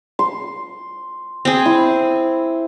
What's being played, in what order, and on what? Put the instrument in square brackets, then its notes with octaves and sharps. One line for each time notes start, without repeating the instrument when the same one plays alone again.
[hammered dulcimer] C6
[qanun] C4 G#4
[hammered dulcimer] E4